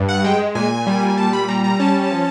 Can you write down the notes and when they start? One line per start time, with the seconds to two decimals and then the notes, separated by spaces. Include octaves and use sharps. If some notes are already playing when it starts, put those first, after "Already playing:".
Already playing: G2
0.08 F#5
0.24 G#3 G5
0.55 A#2 G#5
0.87 G3
1.17 A#2 A5
1.33 B5
1.48 G3 A#5
1.64 A#5
1.79 C#4 A5
2.11 F3